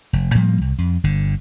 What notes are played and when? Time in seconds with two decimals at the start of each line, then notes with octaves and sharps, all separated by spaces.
0.13 F1
0.35 A2 F3 G3 A#3
0.61 C2
0.78 F2
1.04 G1 D3